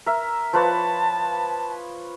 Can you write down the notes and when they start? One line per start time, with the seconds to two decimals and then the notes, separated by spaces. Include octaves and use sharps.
0.06 A#4 E5
0.53 F3 B4 C#5 A5